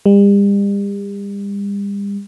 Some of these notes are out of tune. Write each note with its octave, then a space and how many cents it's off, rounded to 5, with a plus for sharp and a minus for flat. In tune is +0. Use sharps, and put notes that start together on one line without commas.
G3 +40